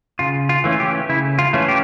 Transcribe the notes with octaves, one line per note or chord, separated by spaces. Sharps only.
C#3 F4
F4
E3 A3 C#4
G4
C#3 E4
F4
E3 A3 C#4
G4